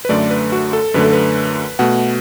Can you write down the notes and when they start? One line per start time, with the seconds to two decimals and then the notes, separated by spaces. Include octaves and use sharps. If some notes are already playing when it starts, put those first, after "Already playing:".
0.05 B4
0.09 F#2 D3 A3 D5
0.31 B4
0.52 F#4
0.73 A4
0.94 F#2 D3 A3 B4
1.04 A4
1.13 B4
1.79 B2 A3 F#5